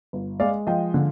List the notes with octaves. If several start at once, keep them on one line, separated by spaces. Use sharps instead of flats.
G1
G#3 D5 F5
F3 D#5 G5
D3